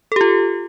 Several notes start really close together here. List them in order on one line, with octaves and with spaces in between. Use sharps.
A4 G4 F4